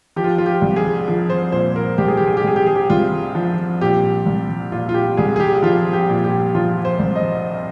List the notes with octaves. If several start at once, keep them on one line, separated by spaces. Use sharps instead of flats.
F3 G4
F4
F4
G4
C2
G#4
F3
C5
A#2 C5
A#4
C2 G4
G#4
G4
G#4
G4
C2 G#4
G4
G#4
G4
C2 F4
F3
A#2 G4
C2
A#2 F4
F4
G4
C2 G#4
G#4
G4
F3 F4
G4
A#2
G4
F3 F4
C5
C2
D#5